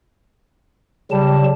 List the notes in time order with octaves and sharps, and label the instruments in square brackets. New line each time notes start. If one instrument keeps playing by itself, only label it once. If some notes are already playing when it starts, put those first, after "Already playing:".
[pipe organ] C#3 F#3 A5 [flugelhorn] G3